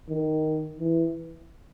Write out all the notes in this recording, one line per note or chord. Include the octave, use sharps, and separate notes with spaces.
D#3
E3